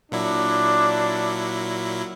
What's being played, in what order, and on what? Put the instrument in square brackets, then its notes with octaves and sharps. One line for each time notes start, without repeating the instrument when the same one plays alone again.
[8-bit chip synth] A#2 F#3 E4 [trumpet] D4